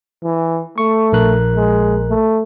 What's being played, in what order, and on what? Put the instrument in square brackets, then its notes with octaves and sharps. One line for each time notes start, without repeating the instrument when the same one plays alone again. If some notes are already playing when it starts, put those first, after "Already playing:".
[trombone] E3
[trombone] A3 [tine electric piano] C#6
[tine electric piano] A#1 A#4 F#6
[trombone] G#3
A3